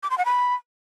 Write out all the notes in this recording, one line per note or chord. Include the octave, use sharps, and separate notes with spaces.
D6
C6
F#5
B5